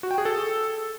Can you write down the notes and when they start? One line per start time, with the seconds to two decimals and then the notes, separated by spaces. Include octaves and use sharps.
0.03 F#4
0.11 G5
0.18 G#4
0.25 A4